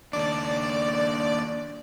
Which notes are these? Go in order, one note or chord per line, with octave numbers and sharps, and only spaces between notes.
D#2 D4 D5